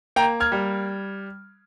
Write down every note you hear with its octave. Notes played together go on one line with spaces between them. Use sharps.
A#3 G5 A#5
F6 G#6
G3